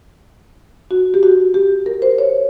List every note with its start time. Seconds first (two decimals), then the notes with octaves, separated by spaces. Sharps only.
0.91 F#4
1.14 G4
1.23 F#4
1.54 G4
1.86 A#4
2.02 C5
2.18 C#5